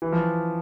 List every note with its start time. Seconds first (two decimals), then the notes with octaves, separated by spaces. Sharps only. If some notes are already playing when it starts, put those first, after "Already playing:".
0.02 E3
0.12 F3